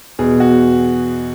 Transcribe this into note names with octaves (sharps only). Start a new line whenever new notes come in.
E2 B2 G#4
F#4